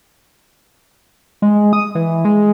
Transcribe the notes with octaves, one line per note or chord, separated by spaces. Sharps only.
G#3
D#6
E3
G#3